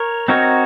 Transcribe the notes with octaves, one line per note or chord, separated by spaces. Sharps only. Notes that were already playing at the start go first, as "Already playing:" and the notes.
Already playing: A#4 C#5
C4 D#4 F#4 A#4 C#5